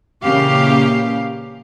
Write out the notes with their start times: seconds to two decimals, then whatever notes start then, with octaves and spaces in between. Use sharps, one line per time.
0.24 A#2 C#3 E3 A#3 G4 F5